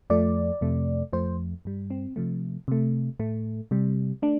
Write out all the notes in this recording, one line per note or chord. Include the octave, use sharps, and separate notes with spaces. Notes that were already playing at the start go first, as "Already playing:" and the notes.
F2 F3 A3 D5
F2 C3 A3
F2 F3 A3 C5
G2 G3
C4
C3 F3 A3
C3 A3
A2 A3
C3 G3
A3 D4